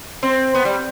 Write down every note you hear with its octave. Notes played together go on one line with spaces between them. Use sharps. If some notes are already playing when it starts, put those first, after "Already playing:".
C4
B3
G3